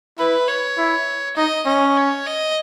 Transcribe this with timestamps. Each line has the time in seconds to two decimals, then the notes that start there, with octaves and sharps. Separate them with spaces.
0.18 E4 B4
0.48 C#5
0.78 E4
1.36 D#4 D#5
1.66 C#4 D#5
1.97 C#5
2.27 D#5